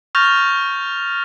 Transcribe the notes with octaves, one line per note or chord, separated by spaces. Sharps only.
C#6 F6 G6 A6 A#6 F7